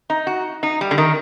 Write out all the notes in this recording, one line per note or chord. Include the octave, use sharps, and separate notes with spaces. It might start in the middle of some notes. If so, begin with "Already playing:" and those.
D#4
F#4
D#4
G3
D3
D#3